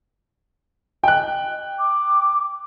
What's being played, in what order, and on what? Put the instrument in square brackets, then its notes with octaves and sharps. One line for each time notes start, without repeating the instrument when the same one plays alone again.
[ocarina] D#5 [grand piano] G5 F#6
[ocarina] D6